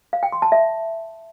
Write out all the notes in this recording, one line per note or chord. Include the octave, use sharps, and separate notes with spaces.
F5
G5
C6
A5
E5